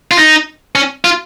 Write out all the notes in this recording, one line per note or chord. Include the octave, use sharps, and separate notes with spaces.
F4
D#4
C#4
F4